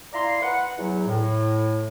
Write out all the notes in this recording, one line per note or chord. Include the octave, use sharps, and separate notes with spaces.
E4 D5 F5 A#5 C6
B4 F#5
E2 F#3
A2